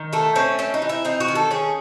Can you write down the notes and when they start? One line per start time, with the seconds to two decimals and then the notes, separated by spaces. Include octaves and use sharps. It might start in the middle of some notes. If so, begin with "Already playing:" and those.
Already playing: D#3
0.13 A3 A4
0.36 C4 C#4
0.59 C4 C#4
0.74 D#4
0.82 E3
0.89 E4
1.05 C4 D#4
1.20 F#4
1.28 D#3
1.35 A4
1.51 C#4 G#4